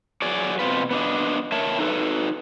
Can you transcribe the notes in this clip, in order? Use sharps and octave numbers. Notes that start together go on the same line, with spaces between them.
F#3 G#4 D5
B2 C4 F4 B4
B3 D4 D#5
A#4 C#5 E5 A5
D#4 A4 B4